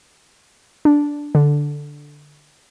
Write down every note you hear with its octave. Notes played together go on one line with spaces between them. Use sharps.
D4
D3